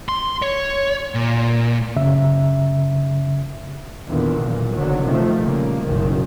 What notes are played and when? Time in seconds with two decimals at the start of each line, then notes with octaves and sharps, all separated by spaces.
0.09 C6
0.42 C#5
1.15 A#2
1.96 F#2 C#3 E5
4.08 E2 A#2 D3 D#3
4.40 B1 A#2
4.73 F#1 B1 D3 D#3 F#3
5.03 C3 D#3 F3 A3
5.40 A#2 C#3 G3 A#3
5.81 F#1 B1 A#2 D#3